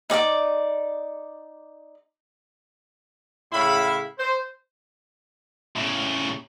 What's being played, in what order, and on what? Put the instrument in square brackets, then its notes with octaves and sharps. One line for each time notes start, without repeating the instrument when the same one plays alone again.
[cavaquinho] D#4 D5 G5 D6
[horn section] A2 C#3 E4 E5 F5 B5
C5
[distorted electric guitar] A2 C#3